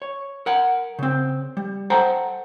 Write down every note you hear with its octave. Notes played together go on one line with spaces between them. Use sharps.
C#5
A#4 F#5
C#3 C4
G3
A4 C5 F#5 G5 A#5